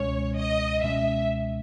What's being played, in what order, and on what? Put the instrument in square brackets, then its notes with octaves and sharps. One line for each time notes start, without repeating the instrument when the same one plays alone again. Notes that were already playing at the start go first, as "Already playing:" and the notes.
Already playing: [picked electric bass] C#2 B2 G#3 C#4 [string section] C#5
[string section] D#5
[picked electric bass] C#2 B2 G#3 C#4 [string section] E5